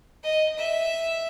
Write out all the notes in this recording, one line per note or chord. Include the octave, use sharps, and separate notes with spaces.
D#5
E5